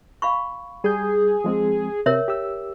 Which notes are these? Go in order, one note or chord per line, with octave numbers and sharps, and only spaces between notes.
F5 B5 C#6
G3 G#4 G6
F3 G#3 C4
C3 A#4 C#5 E5
G4 E6